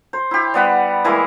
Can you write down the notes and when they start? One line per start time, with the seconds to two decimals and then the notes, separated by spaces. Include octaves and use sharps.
0.13 C5
0.31 E4 G4
0.54 G3 B3 F#5
1.04 E3 G#3 A#3 E4